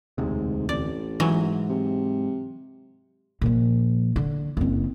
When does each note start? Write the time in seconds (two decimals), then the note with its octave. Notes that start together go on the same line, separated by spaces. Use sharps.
0.18 E1 D2 G#2 C3
0.69 A1 D5
1.20 G#2 E3 F#3
1.69 C3
3.41 A#2 F3
4.16 D3
4.57 F#1 C4